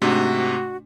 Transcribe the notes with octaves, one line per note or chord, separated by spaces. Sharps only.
G#2 C3 A3 D4 F#4